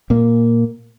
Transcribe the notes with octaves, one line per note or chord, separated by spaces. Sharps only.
A#2 A#3